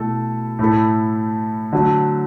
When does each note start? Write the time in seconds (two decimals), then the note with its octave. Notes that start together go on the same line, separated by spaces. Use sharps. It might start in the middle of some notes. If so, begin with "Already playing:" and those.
Already playing: B2 A3 E4 A4
0.59 A2 A3 E4 A4
1.73 D3 F#3 A3